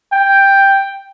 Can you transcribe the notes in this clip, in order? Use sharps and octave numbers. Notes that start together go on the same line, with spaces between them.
G5